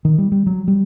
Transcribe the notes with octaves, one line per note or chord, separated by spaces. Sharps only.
D#3
G3
G3
F#3
G3